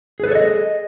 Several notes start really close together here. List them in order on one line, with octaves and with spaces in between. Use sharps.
G#4 B4 A4 C#5 D#5